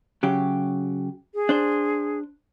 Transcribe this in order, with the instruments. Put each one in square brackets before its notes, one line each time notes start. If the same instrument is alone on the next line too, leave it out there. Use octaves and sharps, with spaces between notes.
[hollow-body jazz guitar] C#3 F#3 G4
[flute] G#4
[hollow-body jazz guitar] D4 C5